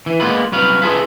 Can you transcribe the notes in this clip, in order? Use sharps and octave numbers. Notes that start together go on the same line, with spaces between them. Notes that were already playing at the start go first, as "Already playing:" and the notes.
E3
G#3 A#3 B3 F4 B4
C2 F#3 B4 F5 B5
E4 F4 G#4 A4 B4